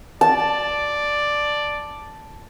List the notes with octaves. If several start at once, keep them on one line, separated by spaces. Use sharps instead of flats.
D5 A5